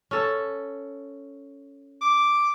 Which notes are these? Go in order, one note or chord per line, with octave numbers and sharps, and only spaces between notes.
C#4 A4
D6